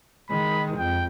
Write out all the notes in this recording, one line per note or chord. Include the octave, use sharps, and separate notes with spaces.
D#3 G#3 B5
F2 G5